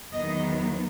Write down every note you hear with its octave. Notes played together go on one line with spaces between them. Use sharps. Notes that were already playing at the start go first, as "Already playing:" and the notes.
E2 D#3 F#3 B3 D#4 D#5